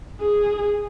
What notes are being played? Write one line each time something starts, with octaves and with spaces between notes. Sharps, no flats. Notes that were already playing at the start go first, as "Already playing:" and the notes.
G#4